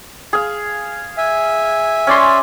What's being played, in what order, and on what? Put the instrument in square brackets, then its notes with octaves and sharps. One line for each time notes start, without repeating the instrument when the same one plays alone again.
[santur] G#4 F5
[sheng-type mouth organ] E5 G#5
[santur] C#4 D5 C6